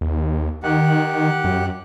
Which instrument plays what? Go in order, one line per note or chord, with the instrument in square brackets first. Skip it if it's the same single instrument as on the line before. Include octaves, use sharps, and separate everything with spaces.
[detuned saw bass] D#2
[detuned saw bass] D#3 [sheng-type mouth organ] G4 F#5
[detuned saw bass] F#2